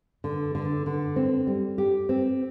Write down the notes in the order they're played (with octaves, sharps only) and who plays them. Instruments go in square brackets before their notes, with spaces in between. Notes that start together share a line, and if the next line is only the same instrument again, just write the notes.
[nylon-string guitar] D3
D3
D3
C4
G3
G4
C4